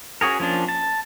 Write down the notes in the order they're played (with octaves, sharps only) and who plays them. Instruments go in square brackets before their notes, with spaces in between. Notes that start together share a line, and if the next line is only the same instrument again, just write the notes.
[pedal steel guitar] C#4 F#4 G#4 A#4
F3 A#3 C#4 D4
A5